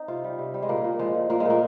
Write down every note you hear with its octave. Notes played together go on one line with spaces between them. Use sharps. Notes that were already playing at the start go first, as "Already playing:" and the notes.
Already playing: C4 D#4
C3 F4
G3
C3
G3
G#3
A#2 A#3
A#2
F3 G#3
A#2
A#2 A#3
G#3
A#2 A#3